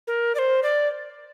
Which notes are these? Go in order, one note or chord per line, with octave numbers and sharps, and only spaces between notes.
A#4
D5
C5
D5